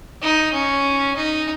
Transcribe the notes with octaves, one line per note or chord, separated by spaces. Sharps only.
D#4
C#4
D#4